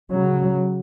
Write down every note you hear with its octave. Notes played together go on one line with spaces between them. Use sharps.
C#3 F#3